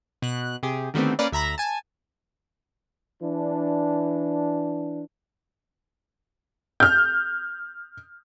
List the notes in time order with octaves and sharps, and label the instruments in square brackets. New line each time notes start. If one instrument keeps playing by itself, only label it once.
[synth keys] B2 F#6
C3 G4 G#4
D3 D#3 G3 A3 B3 C4
A#3 C#4 A#4 B4 D5
D2 E5 A#5 B5 A#6
G#5 A5
[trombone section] E3 D4
[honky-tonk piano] F6 G6